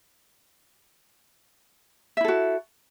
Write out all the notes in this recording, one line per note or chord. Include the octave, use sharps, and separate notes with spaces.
E4 F#4 A4 E5